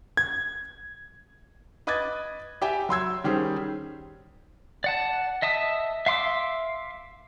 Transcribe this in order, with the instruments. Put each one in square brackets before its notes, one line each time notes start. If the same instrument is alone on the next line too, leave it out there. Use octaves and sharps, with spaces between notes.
[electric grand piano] G#6
[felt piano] B4 D#5 D6 D#6 G#6 A6
G4 D5 E5 G5 G#5
F#3 C6 E6 G#6
D#3 G3 C#4 G#4 C5
[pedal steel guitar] D5 F#5 A5
D#5 E5 A5 D#6
E5 F5 C6 D6 E6